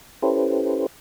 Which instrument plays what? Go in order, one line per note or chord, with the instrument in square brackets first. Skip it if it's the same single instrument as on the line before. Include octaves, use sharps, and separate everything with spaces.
[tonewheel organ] C#4 E4 G4 A4 B4 C5